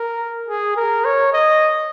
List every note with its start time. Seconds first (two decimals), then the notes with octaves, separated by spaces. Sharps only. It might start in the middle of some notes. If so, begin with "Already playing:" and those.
Already playing: A#4
0.48 G#4
0.77 A#4
1.05 C#5
1.33 D#5